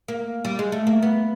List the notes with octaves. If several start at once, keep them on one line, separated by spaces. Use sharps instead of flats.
A#3
G3
G#3
A3
A#3
B3